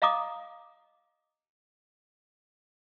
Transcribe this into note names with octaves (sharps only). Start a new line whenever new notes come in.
D#5 F5 A#5 D6 D#6